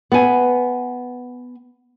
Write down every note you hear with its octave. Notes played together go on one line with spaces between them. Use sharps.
B3 G#5